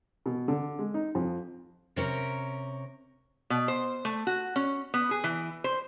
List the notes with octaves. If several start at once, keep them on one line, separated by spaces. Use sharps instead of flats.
B2
D3
G#3
D#4
F2
C3 C#4 A#4
B2
C5
A3
F#4
C#4
B3
G#4
E3
C5